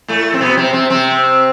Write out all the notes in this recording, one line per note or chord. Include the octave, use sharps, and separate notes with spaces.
A2 A3
C4
B2 B3
C3 C4
C3 C4
C3 C4